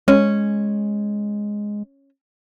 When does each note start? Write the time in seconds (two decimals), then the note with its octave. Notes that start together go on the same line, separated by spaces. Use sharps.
0.08 G#3 C#4